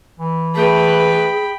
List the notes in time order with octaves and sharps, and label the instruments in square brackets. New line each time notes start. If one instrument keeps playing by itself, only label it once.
[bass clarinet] E3
[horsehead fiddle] A3 B4 [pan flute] G#4 [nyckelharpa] G5 B5